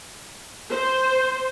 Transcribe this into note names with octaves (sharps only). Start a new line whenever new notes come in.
C5